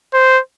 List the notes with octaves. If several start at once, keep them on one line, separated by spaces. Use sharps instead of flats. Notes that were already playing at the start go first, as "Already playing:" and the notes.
C5